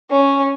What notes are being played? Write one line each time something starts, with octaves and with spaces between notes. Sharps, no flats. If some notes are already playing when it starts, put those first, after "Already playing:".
C#4